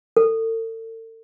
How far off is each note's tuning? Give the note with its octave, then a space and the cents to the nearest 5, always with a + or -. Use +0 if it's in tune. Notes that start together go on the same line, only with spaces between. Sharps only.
A4 +40